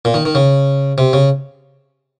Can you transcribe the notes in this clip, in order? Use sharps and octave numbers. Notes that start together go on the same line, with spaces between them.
A#2
D#3
D#3
C#3
C3
C#3